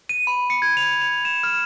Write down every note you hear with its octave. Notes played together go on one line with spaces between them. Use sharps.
D#7
B5
C#7
G#6
F7
F7
E7
F6